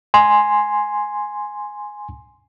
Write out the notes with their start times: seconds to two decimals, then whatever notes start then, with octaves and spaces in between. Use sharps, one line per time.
0.14 G#5 C6